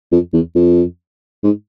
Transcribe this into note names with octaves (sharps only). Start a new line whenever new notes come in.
F2
E2
F2
G#2